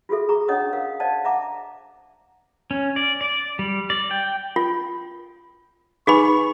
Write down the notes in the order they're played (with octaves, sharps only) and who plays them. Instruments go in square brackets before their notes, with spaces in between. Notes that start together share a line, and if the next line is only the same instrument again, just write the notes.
[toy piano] F4 F#4 G#4 A4 E5
G#4 A#5 C#6
C#4 D4 C#5 D#5 F#5 D#6
A#4 F5
C5 D5 D#5 F5 F#5 A5
E5 F#5 A#5 D6
[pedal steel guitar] C#4
D5
D5
G3
D5
G5
[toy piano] F4
[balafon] D#4 B4 G#5 [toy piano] G#4 B5 [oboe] C#6